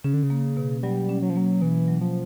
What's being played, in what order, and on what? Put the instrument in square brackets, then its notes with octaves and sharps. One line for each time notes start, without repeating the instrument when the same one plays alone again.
[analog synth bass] C#3 [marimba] C#4
[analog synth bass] D3
C#3
[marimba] A#3
B2
[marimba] F#3 [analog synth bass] G3
[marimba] C#4
[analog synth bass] F#3
F3
[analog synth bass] F#3 [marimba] A#3
[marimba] B2 [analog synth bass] E3
[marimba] F#3
[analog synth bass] F3